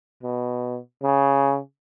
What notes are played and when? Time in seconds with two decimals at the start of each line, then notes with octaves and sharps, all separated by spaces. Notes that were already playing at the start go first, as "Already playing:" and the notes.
0.23 B2
1.03 C#3